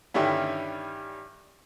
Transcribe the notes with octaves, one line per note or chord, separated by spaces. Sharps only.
G2 D3 D#3 G3 C#4 E4